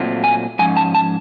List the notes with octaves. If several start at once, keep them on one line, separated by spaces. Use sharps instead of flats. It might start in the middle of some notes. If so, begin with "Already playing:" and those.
Already playing: A#2 F#3 A3 C4 F4
G#5
G#2 F3 C#4 G#5
A5
A5